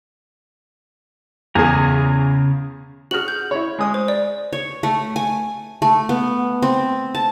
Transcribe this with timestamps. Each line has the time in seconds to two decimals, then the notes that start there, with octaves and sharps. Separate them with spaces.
1.55 E2 C#3 G#4 G#5 A#5
3.11 F#4 G#4 F6 F#7
3.28 G6
3.51 E4 C#5
3.79 G#3 D#6
3.94 C5
4.08 D5
4.53 C#5
4.83 A3
5.16 G#5
5.82 A3
6.09 B3
6.62 C4
7.15 A5